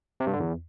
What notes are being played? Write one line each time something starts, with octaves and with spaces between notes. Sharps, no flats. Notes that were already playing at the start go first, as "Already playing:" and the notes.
C3
G2
D3
E2